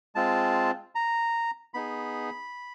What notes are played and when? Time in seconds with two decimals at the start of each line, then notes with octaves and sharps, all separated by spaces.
0.15 G#3 C4 F4 A5
0.95 A#5
1.74 B3 D#4 G#4 B5